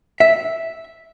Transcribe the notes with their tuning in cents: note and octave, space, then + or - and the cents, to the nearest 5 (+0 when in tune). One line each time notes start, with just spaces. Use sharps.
E5 -5